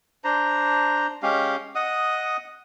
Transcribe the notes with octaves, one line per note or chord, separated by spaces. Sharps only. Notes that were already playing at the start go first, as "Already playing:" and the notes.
D4 C5 A#5
G#3 C#4 G4 F5
D#5 F#5 D#6